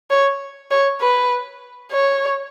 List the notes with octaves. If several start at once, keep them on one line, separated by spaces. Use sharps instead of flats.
C#5
C#5
B4
C#5